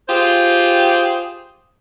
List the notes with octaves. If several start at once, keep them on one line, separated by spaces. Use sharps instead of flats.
F4 G4 G#4 C5